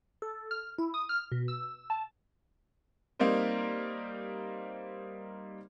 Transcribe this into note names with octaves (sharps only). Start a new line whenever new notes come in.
A4
F6
E4
D#6
F6
B2
E6
A5
G3 A#3 C4 D#4 A#4 C5